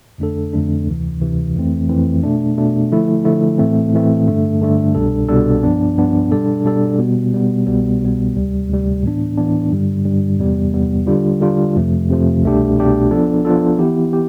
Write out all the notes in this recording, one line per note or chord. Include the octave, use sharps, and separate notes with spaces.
F2 D3 A3 D4 A4
F2 D3 A3 D4 A4
D2 C3 E3
D2 C3 E3
F2 E3 A3 C4
F2 E3 A3 C4
B2 A3 D4
B2 A3 D4
D3 F3 A3 E4
D3 F3 A3 E4
A2 E3 A3 C4
A2 E3 A3 C4
G2 D3 A3 D4
G2 D3 A3 D4
C2 B2 G3 D4 A4
C2 B2 G3 D4 A4
G2 F3 B3 D4
G2 F3 B3 D4
B2 G3 D4 A4 D5
B2 G3 D4 A4 D5
B2 G3 B3
B2 G3 B3
C2 B2 G3 B3
C2 B2 G3 B3
D2 C3 G3
D2 C3 G3
A2 E3 B3 D4
A2 E3 B3 D4
G2 D3 G3
G2 D3 G3
E2 C3 G3 B3
E2 C3 G3 B3
D3 G3 D4 F4
D3 G3 D4 F4
F2 C3 F3 A3
F2 C3 F3 A3
C2 B2 A3 D4 G4
C2 B2 A3 D4 G4
F3 B3 D4 F4 A4
F3 B3 D4 F4 A4
E3 B3 E4 G4
G4